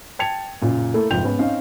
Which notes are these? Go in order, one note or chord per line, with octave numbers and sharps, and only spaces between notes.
G5 A5 G#6 A6 C#7 F7
F#2 A#2 C#3
A3 A#3 E4 A4
F1 G#2 F3 G5 G6 F7
G#2 B3 C#4
C4 C#4 D#4 F5